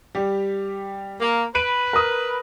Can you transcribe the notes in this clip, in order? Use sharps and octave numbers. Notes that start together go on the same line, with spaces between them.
G3 G4
A#3
B4 D7 D#7
A#4 D#6